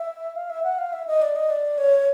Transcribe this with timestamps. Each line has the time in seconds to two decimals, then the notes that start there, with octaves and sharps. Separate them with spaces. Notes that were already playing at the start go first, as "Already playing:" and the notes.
Already playing: E5
0.36 F5
0.50 E5
0.63 F#5
0.78 F5
0.93 E5
1.07 D#5
1.22 D5
1.36 D#5
1.50 D5
1.78 C#5